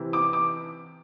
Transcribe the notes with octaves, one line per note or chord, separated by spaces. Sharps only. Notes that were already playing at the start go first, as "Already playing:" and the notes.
Already playing: C3 E3 C4 E4
D6
D6